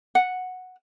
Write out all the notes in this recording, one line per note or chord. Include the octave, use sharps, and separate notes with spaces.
F#5